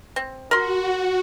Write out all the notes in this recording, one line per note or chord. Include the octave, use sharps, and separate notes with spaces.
C4
F#4 A#4 C6